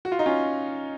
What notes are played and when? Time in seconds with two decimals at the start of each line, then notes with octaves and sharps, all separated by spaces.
0.05 F#4
0.12 F4
0.19 D#4
0.26 C#4 F4